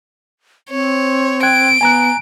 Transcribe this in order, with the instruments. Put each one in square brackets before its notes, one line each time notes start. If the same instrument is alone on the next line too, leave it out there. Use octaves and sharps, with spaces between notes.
[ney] C4 [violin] C#5
[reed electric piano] G5 F#6 G#6 [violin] D7
[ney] B3 [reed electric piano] G#5 A#5 F#6